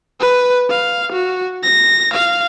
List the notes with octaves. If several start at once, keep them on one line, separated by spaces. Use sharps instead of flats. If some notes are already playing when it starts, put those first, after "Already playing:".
B4
F5
F#4
A#6
F5